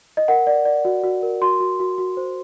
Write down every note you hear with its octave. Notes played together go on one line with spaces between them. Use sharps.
D#5
A#4 F#5
D5
D5
F#4
F#4
A#4
F#4 C6
F#4
F#4
F#4
C5